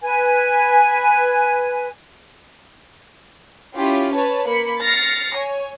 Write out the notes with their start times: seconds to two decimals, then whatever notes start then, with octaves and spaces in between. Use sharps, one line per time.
0.02 B4 G#5
3.76 C#4 E4 F4 G4
4.13 B4 C#5 A5
4.46 A#3 B5 C#7
4.82 F6 A6 A#6 C7 C#7
5.35 C#5 G#5